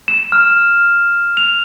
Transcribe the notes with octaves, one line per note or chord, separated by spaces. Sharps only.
E7
F6
F7